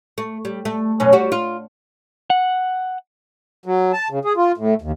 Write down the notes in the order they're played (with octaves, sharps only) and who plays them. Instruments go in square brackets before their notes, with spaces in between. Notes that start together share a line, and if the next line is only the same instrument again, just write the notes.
[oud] A3
G3
A3
F#2 B2 C#4
G3 F#4
F4
[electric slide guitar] F#5
[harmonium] F#3
A5
C#3
G#4
F4
A2
D#2